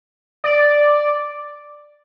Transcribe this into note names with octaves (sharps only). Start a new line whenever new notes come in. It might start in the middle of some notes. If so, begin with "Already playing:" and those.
D5